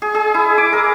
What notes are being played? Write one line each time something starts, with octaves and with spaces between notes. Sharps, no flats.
G#4
G#4
E4
D6
A#4